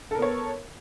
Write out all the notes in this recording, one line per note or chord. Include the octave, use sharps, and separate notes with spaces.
B3 A4 A#4 C#5